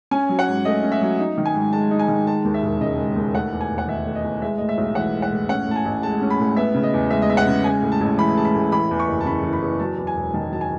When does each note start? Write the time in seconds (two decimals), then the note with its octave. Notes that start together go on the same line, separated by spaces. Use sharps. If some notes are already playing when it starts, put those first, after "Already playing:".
0.11 C#4 G#5
0.29 F#3
0.39 F#5
0.48 G#2
0.65 A3 D#5
0.83 C#4
0.92 E5
1.01 F#3
1.19 D#4
1.38 D#3
1.46 G#5
1.54 G#2
1.73 G#3 A5
1.91 D#4
1.99 G#5
2.08 D#3
2.27 G#3 A5
2.45 D#2
2.54 E5
2.63 E1
2.81 C#3 D#5
2.98 G#3
3.16 D#2
3.34 A3 F#5
3.52 E2
3.61 G#5
3.70 E1
3.78 F#5
3.88 D#3 E5
4.06 A3
4.16 D#5
4.24 E2
4.42 G#3 E5
4.58 A2 D#5
4.69 E5
4.78 B1
4.95 E3 F#5
5.14 G#3
5.22 F#5
5.32 A2
5.49 C#4 F#5
5.67 A2 A5
5.76 G#5
5.85 A1
6.03 G#3 A5
6.22 C#4
6.30 B5
6.40 A2
6.57 B3 E5
6.74 C#3
6.83 D#5
6.94 E2
7.10 G#3 E5
7.22 D#5
7.29 B3 E5
7.37 F#5
7.47 C#3
7.64 G#3 G#5
7.82 A2
7.92 A5
8.01 A1
8.18 E3 B5
8.37 G#3 A5
8.45 B5
8.55 A2
8.72 E3 B5
8.91 E2
8.99 C#6
9.08 F#1
9.21 A5
9.26 C#3 B5
9.43 E3
9.53 B5
9.62 E2
9.80 F#3 A5
9.98 E2
10.07 G#5
10.16 E1
10.34 D#3 A5
10.52 F#3 A5
10.61 G#5